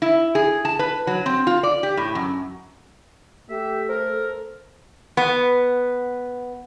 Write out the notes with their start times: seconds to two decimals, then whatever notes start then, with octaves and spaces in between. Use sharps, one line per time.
0.02 E4
0.35 G#4
0.65 A5
0.79 B4
1.07 F#3
1.26 C4
1.47 F4
1.63 D5
1.83 G4
1.97 A2
2.15 F#2
3.50 A3 G4 E5
3.89 A4 A#4 C5
5.17 B3